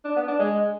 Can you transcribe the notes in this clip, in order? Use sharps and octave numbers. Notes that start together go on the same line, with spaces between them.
D4
B3
D4
G#3